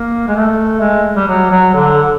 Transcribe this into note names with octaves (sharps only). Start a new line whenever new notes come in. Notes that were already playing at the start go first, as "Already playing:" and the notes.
Already playing: A#3
G#3
A3
G#3
G3
F#3
F#3
D3